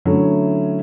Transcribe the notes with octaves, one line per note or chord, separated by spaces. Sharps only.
D3 F#3 A3 C#4 E4